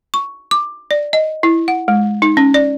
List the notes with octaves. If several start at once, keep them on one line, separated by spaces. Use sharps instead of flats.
C#6
D6
D5
D#5
E4
F#5
G#3
D#4
C#4
D5